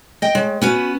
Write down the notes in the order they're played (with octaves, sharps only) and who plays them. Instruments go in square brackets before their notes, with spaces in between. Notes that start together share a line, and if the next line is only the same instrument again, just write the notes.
[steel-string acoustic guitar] D#5 G5
[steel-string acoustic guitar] G#3 [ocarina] C#5
[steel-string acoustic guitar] B3 C#4 B4 [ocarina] F#4